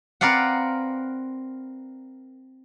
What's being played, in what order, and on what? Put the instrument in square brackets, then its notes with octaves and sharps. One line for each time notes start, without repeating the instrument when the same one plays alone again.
[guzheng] C4 A#4 B4 D5 F5 F#5